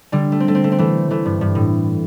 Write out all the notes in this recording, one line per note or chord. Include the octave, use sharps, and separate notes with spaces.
D3 G3
A3
C4
A3
C4
A3
C4
E3 A3
E3 A3
G2
G2
A2